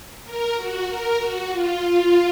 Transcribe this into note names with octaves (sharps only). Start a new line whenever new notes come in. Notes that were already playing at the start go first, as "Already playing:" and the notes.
A#4
F#4
A#4
F#4
F4
F4